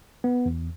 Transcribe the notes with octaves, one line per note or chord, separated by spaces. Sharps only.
B3
E2